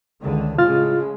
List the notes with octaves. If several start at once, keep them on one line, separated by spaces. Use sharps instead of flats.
C#2 D3 D#3
A2 C#3 G#3 F4 F6 A6